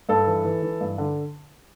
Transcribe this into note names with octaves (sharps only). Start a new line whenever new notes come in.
G2 A4
E3
E3
E3
G2
D3